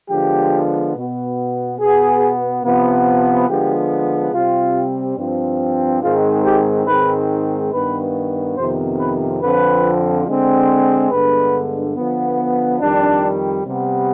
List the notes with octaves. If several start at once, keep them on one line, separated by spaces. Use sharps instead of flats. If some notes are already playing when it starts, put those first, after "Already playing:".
D3 F3 G#3 B3 G4
B2 B3
B2 B3 G#4
C3 F3 B3
D3 F3 G#3 B3 G4
C3 G3 C4 F4
G2 F3 C4
G#2 D#3 G#3 C4 F4
G4
G#2 D#3 G#3 C4 B4
G2 D#3 B3 B4
F2 C3 D#3 B3 C5
B4
F2 D3 F3 C4 B4
D3 G#3 C4
G2 D3 G#3 B3 B4
D3 F3 B3
F2 D#3 G3 D4
C3 G3 B3